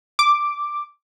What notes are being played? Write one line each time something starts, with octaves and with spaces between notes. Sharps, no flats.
D6